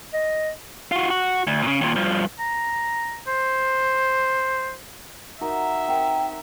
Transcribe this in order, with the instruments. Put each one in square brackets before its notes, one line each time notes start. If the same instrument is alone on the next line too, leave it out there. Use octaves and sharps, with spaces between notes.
[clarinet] D#5
[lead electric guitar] F4 F#4
F#4
D2
A#2 C#3
D#2 A#2
G2 F3
[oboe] A#5
C5
[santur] D#4 F#4 A#4 [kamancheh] E5
[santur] C4 A#4 [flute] G5